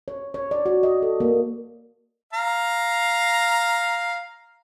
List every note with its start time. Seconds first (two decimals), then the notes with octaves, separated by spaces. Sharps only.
0.08 C#5
0.34 C#5
0.51 D5
0.66 F#4
0.83 D#5
1.02 A4
1.20 A#3
2.33 F5 A#5